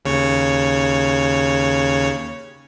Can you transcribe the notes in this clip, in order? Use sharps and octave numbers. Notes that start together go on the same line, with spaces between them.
D#2 C#3 C#5